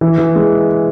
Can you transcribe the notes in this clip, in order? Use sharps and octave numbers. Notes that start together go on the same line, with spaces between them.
E3
E3
G#3